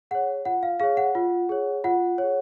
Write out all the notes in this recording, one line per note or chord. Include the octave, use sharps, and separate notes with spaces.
G#4 C#5 F#5
F4 F#5
F5
G#4 C#5 F5
F#5
F4
G#4 C#5
F4 F#5
G#4 C#5